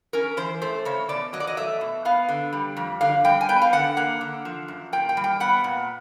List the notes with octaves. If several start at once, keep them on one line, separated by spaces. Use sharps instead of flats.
C#4 A#4
E3 C5
A3 C5
C#3 C#5
B2 D5
F#3 D#5
D5
D#5
A3 E5
B2
B3 F5
D3
G3
F2
D3 F5
G3 G5
G#5
B3 G5
F5
D3 F#5
A#3 F#5
D3
F3
F#2
A#2 G5
G5
G3
G5
B3 F#5
A#2